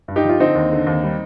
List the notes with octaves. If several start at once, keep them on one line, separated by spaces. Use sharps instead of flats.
G2
D#4 G4
F3 F4
D3 C4 D#4
D#2
D3
D#2
G3